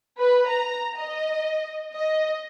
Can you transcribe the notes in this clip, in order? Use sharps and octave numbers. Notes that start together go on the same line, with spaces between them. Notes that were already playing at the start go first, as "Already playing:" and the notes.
B4
A#5
D#5
D#5